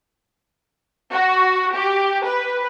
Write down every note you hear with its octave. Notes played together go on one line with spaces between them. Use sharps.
F#4
G4
B4